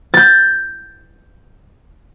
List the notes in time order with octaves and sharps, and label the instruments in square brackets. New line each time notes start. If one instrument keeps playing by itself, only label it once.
[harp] G6 A6